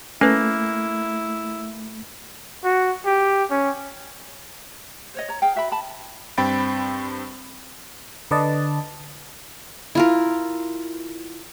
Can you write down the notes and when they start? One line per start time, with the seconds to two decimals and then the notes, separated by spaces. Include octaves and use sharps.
0.21 A3 A#3 C#4 E4 B4
2.64 F#4
3.06 G4
3.51 C#4
5.14 C5 C#5 D#5
5.29 C#5 A#5
5.42 G#4 F5 G5
5.56 F#4 E5 G5 B5
5.72 A5 B5
6.38 G2 C4 G5 B5 A6 D7
8.31 D3 B4 D5 D#5 A5
9.95 E4 F4 A#4